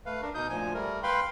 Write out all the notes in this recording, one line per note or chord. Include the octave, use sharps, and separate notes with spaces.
A3 B4 F5
D4 A#4
B2 D#4 D#6 G6
D2 A#2 F3 G#5
G3 A3 A#4
B4 F5 G5 B5 C6